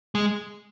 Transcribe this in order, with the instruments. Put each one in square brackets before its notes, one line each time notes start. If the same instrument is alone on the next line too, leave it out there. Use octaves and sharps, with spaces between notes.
[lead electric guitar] G#3